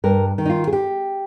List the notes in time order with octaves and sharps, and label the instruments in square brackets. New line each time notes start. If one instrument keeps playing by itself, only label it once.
[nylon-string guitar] G2 A#4
D#3
D#4
F4
G#4
G4